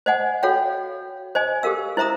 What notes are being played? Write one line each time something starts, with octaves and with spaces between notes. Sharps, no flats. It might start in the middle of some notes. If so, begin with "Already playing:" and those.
C5 D#5 F#5 G#5
F#4 A4 C#5 F5 G5
C5 D#5 G#5
G4 A4 A#4 F5 E6
E4 C5 E5 A#5 D#6